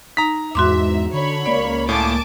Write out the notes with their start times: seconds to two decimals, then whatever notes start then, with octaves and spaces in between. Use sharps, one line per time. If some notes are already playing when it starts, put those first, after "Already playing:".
0.17 D#4 A#5 B6
0.55 E2 G#2 F#4 E5 C6 D6
1.13 D3 C#5 B5
1.46 C#2 A#3 D5
1.89 A2 G#5 A5 D6